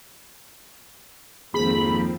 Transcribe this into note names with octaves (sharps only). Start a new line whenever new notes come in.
G#1 F2 F3 A#3 C4 G#4 B5